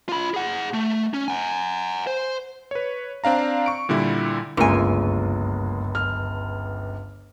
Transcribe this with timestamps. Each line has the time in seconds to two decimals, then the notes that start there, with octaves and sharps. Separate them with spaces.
0.09 F4 B5
0.34 G#4 F#5
0.73 A3
1.14 C#4
1.28 F#5 G#5
2.07 C5
2.71 B4 C#5
3.24 C4 D4 F5 A#5
3.66 C#6 D7
3.89 A#2 D3 G3 E4
4.57 G1 C#2 F#2 G#3 A#3 F4 G#5
5.95 F6